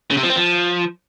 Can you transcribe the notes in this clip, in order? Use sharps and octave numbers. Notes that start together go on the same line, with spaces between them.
C#3
C3
F3
C4
F3